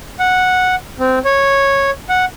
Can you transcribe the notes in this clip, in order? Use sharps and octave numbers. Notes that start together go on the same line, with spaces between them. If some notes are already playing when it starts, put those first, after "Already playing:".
F#5
C4
C#5
F#5